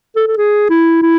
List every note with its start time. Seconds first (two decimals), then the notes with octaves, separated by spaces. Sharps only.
0.16 A4
0.27 A4
0.37 G#4
0.70 E4
1.02 E4